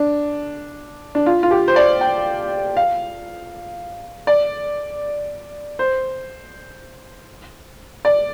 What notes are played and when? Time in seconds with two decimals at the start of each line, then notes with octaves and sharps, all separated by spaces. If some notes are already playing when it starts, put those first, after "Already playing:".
Already playing: D4
1.15 D4
1.26 F4
1.43 F4
1.51 G4
1.68 C5
1.76 D5
2.01 G5
2.77 F5
4.27 D5
5.79 C5
8.05 D5